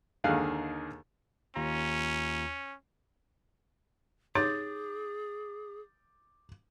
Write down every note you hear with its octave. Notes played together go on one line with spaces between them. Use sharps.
D#2 D3 D#3 G#4 F5 F#6
D#2 C#4 F4 A#5
D#4 G4 G#4 C#5 D6 G6 A6